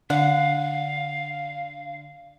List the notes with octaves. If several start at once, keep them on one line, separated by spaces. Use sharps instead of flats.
D3 F5 F#5